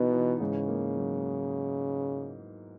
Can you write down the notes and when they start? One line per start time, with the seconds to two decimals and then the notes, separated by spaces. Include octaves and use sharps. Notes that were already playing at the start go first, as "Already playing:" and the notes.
Already playing: B2 E3 B3 D#4
0.12 E3
0.41 G#2 C#3
0.68 A#3
0.97 F#3